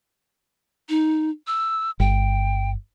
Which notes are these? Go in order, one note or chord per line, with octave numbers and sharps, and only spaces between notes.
D#4
E6
G1 G5